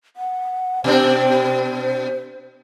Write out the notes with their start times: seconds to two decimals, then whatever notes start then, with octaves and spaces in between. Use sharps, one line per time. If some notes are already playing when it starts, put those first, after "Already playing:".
0.16 F#5
0.84 B2 C4 D4 C5